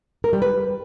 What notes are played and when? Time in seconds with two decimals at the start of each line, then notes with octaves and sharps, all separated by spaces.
0.24 A#4
0.33 G3
0.42 B4